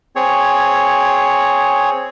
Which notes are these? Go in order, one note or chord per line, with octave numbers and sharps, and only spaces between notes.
C4 G#4 C#5